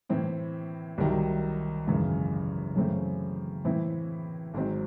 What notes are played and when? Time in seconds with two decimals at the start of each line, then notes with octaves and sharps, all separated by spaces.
0.09 A2 E3 C4 E4
0.98 C2 C3 D#3 F#3
1.87 G#1 F#2 C#3 E3
2.76 F#2 C#3 E3 A3 C4
3.65 A2 E3 C4 E4
4.54 G#1 G#2 F#3 C4